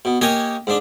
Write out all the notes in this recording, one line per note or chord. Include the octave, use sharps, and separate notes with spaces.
B2
A#3 G4 C#5 D#5 G#5
G#2 D4